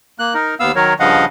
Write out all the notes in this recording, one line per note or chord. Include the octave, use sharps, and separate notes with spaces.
A#3 F#6
D#4 A#4
D#2 B3 F5 E6
D#3 F#3 A#4 C#5
G2 C#3 F3 D#5 F5 F#5